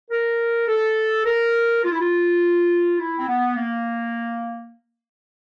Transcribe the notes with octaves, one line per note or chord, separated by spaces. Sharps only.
A#4
A4
A#4
F4
E4
F4
E4
C4
B3
A#3